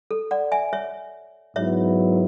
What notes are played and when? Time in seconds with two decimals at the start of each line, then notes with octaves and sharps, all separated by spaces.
0.11 A4
0.31 D5 F#5
0.52 E5 G#5
0.73 C#5 E5
1.56 G#2 F#3 B3 E4 C#5 E5